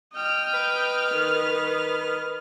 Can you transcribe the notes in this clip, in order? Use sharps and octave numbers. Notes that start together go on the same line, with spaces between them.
D#5 G5 F6
B4
D#3